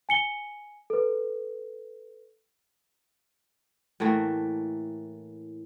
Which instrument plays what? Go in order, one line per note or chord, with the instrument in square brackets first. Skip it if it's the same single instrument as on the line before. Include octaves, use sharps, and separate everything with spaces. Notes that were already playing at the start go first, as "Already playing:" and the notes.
[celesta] G#5 C#7 G7
A4 B4
[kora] A2 E3 A3 A#3